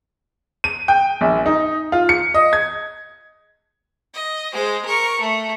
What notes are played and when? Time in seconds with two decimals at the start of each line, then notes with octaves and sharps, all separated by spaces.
0.64 D#7
0.88 G5
1.21 A#1
1.46 D#4
1.92 F4
2.09 C#7
2.34 D#5
2.53 G#6
4.14 D#5
4.53 G#3 C5
4.86 A#4 C#6
5.21 A3